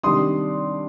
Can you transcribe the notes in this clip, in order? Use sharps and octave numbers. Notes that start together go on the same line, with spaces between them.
C3 D#3 G3 D4 C6 D#6